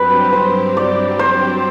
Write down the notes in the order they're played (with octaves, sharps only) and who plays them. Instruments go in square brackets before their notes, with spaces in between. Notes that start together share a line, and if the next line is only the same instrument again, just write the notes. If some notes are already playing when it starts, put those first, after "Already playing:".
Already playing: [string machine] G2 F#3 C4 G4 [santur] B4
[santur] C5
D5
C5